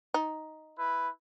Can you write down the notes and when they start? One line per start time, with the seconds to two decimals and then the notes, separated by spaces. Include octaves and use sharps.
0.14 D#4
0.78 E4 B4